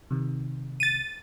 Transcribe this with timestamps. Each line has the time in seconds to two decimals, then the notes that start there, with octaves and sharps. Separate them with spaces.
0.11 C3 D#3
0.80 A6 D#7